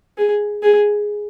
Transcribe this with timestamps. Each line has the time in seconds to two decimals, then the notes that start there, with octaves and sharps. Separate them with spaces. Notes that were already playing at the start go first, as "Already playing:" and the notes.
0.18 G#4
0.63 G#4